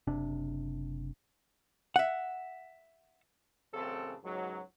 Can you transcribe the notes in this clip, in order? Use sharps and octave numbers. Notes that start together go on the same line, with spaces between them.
F#1 C3 D4
E5 F#5
A1 F#2 C#3 C4 A4
C#2 G#2 F#3